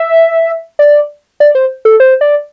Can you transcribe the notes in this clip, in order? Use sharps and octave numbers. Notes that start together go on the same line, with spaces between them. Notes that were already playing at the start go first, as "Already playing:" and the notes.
Already playing: E5
D5
D5
C5
A4
C5
D5